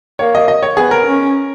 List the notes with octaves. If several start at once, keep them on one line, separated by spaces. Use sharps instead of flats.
A#3 C#5
D#5
D#5
C#5
B3 G#4
A#4
C#4